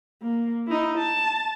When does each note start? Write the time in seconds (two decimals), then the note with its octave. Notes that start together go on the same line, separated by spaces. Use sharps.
0.22 A#3
0.67 D#4 E4
0.98 A5